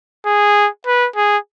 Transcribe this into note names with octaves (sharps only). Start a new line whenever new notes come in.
G#4
B4
G#4